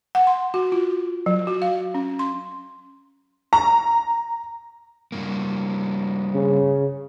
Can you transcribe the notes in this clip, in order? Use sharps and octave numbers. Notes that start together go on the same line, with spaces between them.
F#5
C6
F#4
F4
F#3
F#4
F5
C#4
C6
A#5
G2 A#3
C#3